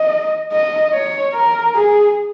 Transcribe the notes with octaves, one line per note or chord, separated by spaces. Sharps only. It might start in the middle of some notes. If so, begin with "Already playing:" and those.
Already playing: D#5
D#5
C#5
A#4
G#4